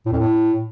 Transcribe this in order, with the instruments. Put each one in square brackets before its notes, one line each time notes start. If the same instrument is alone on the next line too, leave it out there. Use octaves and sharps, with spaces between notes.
[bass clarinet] A2
F2
A2